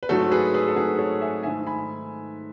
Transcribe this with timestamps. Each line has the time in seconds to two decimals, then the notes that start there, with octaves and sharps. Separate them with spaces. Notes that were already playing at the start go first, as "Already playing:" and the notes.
0.03 B4
0.09 G#2 F#3 A3 F#4 A4
0.31 G#4 B4
0.54 G#4 B4
0.68 A4
0.76 G#2 F#3 A3 G#4 B4
0.99 A4 C#5
1.21 E5 G#5
1.43 G#2 D#3 A3 E5 G#5
1.67 G#5 B5